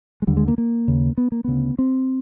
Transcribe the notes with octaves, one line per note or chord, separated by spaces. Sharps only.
G#3
D#2 D3 G3
G#3
A#3
A#3
D#2 C#3
B3
A#3
D2 C#3 B3
C4